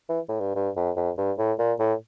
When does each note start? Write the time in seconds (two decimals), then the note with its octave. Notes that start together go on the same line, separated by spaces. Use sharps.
0.09 E3
0.29 A2
0.40 G2
0.55 G2
0.76 F2
0.96 F2
1.17 G2
1.38 A2
1.58 A#2
1.79 A2